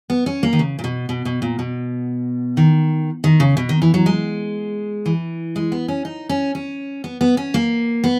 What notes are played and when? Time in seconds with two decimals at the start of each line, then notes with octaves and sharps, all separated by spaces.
0.10 B3
0.26 C#4
0.43 A#3
0.53 D#3
0.59 C#3
0.79 A#2
0.84 B2
1.09 B2
1.25 B2
1.42 A#2
1.59 B2
2.57 D#3
3.24 D#3
3.40 C#3
3.57 B2
3.69 D#3
3.82 E3
3.94 F#3
4.06 G#3
5.06 E3
5.56 G#3
5.72 B3
5.88 C#4
6.05 D#4
6.29 C#4
6.55 C#4
7.04 B3
7.21 B3
7.37 C#4
7.54 A#3
8.04 B3